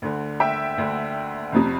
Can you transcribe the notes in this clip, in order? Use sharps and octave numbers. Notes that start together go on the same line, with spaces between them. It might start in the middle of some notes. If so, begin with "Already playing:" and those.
D2 D3
E5 G5
D2 D3
F1 F2 C3